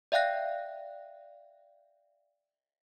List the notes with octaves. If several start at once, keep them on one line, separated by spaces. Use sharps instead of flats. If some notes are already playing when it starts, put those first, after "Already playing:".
D5 E5 F5 G5 F#6 A#6